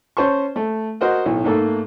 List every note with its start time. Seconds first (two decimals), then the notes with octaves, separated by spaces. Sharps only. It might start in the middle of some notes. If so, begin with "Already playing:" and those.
0.17 C#4 C5 A5 C#6
0.56 A3
1.01 F#4 A#4 C5 D#5 F#5
1.26 B1 A2
1.44 G#2 A3 A#3 A4